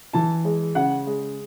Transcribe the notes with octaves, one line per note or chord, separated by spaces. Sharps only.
E3 A5
G#3
C#3 F#5
G#3